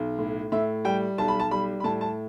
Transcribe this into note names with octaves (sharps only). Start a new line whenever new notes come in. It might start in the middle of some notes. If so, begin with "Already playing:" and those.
Already playing: B1
A2
A2 E5
G3 G5
B1 A5
B5
A5
G3 B5
B5
A2 A5
A5